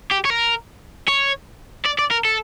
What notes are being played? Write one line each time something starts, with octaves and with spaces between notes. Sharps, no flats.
G4
C#5
A#4
C#5
D5
D5
A#4
A4